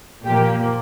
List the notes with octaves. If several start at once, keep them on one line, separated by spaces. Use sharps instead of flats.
A#2 F3 A#3 G4